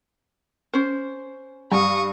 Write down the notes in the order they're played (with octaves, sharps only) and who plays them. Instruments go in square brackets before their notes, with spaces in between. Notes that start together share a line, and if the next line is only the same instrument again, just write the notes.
[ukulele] C#4 C5
[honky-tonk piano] G2 F5 [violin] C#6 D#6